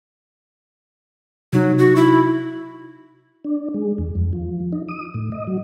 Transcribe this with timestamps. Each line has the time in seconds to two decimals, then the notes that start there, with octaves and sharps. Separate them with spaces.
1.53 C3 F#3 D#4
1.79 F#4
1.96 E4
3.45 D4
3.74 G#3
3.98 E2
4.15 F2
4.33 F3
4.72 D#4
4.88 D#6
5.14 A2
5.32 D#5
5.47 F#3